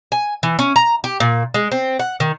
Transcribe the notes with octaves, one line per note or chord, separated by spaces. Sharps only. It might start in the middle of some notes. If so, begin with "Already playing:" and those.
G#5
E3
C#4
A#5
G4
A#2
G#3
C4
F#5
D#3